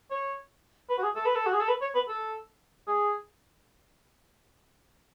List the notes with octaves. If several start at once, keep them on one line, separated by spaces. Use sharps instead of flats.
C#5
B4
F#4
G#4
A4
B4
A4
F#4
G#4
A4
B4
C#5
B4
A4
G#4